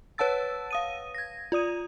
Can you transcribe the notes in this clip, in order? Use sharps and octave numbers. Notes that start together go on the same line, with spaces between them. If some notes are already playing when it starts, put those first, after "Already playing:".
B4 C#5 F#5 A5 E6 A6
F5 D#6 D#7
G#6 A#6
F4 D5 D#6 D#7